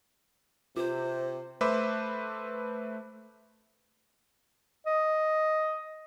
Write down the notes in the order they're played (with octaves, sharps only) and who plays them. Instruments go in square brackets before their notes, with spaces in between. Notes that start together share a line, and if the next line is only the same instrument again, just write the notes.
[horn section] C3 [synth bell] F4 [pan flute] C5
[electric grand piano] A3 B4 C5 E5 D6
[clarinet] D#5